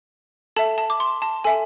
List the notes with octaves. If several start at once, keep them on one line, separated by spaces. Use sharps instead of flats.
A4 E5 A5
A5
D6
C6
A5
A4 E5 G#5